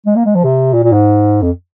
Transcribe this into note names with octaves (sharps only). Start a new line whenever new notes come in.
G#3
A#3
G#3
F3
C3
A#2
A#2
G#2
F2